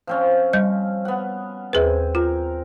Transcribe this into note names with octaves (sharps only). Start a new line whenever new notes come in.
F3 C4 C#4
G3 D#5
B3 F#5
D#2 C4 G#4 B4 G#5
F4 A#4